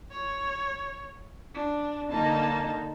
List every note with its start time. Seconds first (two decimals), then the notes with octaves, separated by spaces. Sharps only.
0.11 C#5
1.54 D4
2.11 D3 A#3 D#4 A5